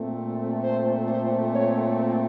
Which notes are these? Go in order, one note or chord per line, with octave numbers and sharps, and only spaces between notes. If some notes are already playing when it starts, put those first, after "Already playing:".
Already playing: A#2 A3 C4
C5
C5
C#5